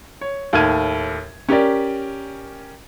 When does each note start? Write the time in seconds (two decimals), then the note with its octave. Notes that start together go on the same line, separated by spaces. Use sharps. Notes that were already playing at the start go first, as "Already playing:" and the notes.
0.21 C#5
0.53 D#2 A2 A5 F6 G#6 D#7
1.49 C#4 G4 A#4 D5